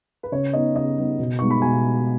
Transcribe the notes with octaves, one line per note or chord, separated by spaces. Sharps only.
B4
C#3 C#5
B3 D#4 D#5
C#3 D#5
B3 D#4
B2
G#3 B3 D#4 C#6
B5
B2 G#5